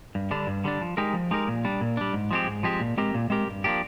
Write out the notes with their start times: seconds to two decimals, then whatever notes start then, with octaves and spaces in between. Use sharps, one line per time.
0.15 G2
0.31 D3 G3 D4
0.47 G2
0.64 D3 G3 D4
0.82 F3
0.97 G#3 D#4 G4 A#4
1.14 F3
1.31 G#3 D#4 G4 A#4
1.48 A#2
1.65 G3 D4
1.81 A#2
1.97 G3 D4
2.13 G#2
2.31 F3 G#3 C4 G4
2.47 G#2
2.63 F3 G#3 C4 G4
2.80 A#2
2.97 G#3 C4 G4 A#4
3.14 A#2
3.30 G#3 C4 G4 A#4
3.48 G2
3.64 F3 A#3 D4 G4